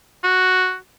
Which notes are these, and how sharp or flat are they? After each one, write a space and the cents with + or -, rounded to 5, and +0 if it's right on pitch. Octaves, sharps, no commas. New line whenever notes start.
F#4 +0